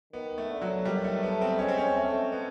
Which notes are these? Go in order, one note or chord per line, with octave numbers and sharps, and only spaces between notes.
D#3 B3
A3
D3
F#3
D#3 G3
A3
A3 B3
C4
G#3 C#4
C4
C#4
A3
B3